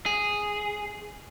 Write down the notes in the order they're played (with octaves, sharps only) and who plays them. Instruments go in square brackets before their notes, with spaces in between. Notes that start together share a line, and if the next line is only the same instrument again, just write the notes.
[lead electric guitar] G#4